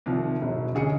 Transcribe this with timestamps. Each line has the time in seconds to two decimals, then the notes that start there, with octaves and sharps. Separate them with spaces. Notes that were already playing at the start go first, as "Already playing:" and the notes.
0.06 C2 D#3 F3
0.41 E1 F#3
0.75 D2 C#4 G#4 D#5 C#7